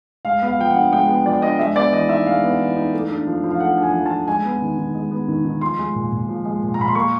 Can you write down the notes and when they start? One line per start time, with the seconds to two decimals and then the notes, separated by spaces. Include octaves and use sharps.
0.25 G#3 F5
0.42 B3
0.48 F5
0.59 F3 G5
0.70 D4 F#5
0.92 G#3 G5
1.09 B3
1.26 F3 D5
1.42 D4 D#5
1.59 G#3 E5
1.76 B3 D5
1.93 E3 D#5
2.09 D#4 E5
2.26 G#3 F5
2.44 B3
2.60 E3
2.76 D#4
2.94 A3
3.10 D4
3.27 F3
3.44 F3
3.51 F5
3.60 A3 F#5
3.78 D4
3.83 G#5
3.94 F3
4.06 A5
4.11 F3
4.28 G#3 G#5
4.45 B3
4.62 D#3
4.78 D#3
4.95 G#3
5.11 B3
5.28 D#3
5.45 D#3
5.61 F3 C6
5.79 G#3
5.95 A#2
6.12 A#2
6.29 F3
6.45 G#3
6.63 A#2
6.74 A#5
6.79 A#2 B5
6.88 C6
6.95 A#3 C#6